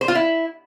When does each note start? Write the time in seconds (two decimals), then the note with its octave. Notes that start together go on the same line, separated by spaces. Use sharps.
0.01 C5
0.08 F4
0.15 E4